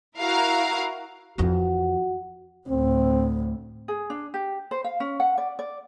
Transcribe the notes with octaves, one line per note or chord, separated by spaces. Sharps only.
E4 F#4 A#4 F5 A#5
F2 E3 F#4
D2 A2 C4
G#4
D4
G4
C5
F5
C#4
F#5
D5
D5